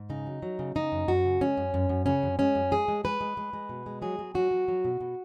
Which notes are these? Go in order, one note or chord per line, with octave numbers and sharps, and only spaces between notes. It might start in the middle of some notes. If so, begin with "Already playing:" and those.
Already playing: G#2
C#3 D#4
F#3
F#3
C#3
C#3 D#4
F#2
F#2 F#4
C#3
G#3 C#4
F#2
F#2
F#2
C#3 C#4
F#2
G#3 C#4
F#2
G#3 G#4
G#3
G#3 B4
G#3
G#3
G#3
B2
G#3
F#3 G#4
F#3
F#3 F#4
F#3
F#3
B2
B2